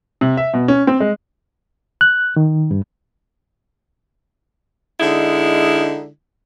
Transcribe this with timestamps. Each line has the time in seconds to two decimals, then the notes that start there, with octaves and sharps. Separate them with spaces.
0.21 C3
0.37 E5
0.54 B2
0.68 C#4
0.87 C4
1.00 G#3
2.01 F#6
2.36 D#3
2.71 G2
4.99 D3 G#3 D#4 E4